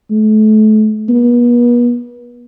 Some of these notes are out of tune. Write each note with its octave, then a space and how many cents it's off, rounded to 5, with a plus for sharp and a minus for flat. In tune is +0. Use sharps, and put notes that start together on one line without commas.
A3 -35
B3 -40